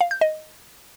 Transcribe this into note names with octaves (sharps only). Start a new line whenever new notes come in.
F5
G6
D#5